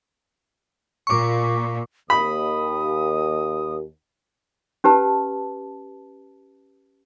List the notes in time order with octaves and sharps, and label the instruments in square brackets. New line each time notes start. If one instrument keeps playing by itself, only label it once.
[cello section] A#2 [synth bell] C#6 D6
[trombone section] D#2 [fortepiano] B5 [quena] D#6
[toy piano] C#4 G4 B4 A5